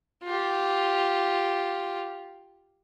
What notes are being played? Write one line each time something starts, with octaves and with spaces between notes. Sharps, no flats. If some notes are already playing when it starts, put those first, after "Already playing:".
F4 G4